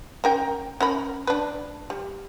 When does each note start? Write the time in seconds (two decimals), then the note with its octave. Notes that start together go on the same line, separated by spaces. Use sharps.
0.24 C#4 A#4 G5
0.81 C#4 A#4 B5
1.27 D4 B4
1.90 G3